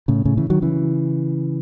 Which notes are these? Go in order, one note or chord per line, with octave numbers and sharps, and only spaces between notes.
A2 C#3
A2 C#3
C#3 E3
D#3 F#3
C#3 E3